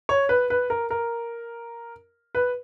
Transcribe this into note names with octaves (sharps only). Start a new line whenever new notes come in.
C#5
B4
B4
A#4
A#4
B4